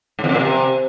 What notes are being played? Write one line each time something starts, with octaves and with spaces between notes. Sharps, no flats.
G#2
E2
F2
A#2
C3